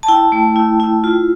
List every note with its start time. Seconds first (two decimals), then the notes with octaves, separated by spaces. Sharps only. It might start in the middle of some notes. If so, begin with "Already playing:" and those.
0.03 A5
0.08 E4 G5
0.32 A3
0.56 E4
0.80 E4
1.04 F4